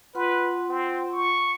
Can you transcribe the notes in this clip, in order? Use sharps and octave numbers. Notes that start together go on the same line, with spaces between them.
F4 B4 F#5 C6
C4
C#6